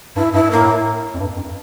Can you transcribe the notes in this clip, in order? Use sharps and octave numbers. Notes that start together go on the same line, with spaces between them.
G2 E4
G2 E4
A2 A#3
F2
G2
F2